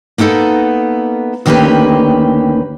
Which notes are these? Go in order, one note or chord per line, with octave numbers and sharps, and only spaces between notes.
A#3 B3 D#4 A4 A#4
D2 D#3 A#3 C#4 G4 B4